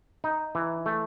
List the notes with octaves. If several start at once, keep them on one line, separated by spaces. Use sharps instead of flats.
D#4
E3
A3